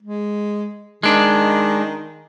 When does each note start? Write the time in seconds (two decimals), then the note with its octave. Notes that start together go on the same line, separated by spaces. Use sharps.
0.03 G#3
1.03 D#3 G#3 D4